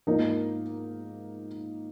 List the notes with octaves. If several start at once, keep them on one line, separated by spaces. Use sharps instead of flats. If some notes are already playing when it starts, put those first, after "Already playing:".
G#2 F3 A#3 D#4